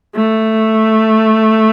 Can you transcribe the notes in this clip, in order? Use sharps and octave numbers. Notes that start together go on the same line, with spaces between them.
A3